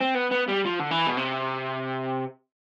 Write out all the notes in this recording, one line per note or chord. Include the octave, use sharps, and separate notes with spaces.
C4
B3
B3
G3
F3
D3
E3
B2
C3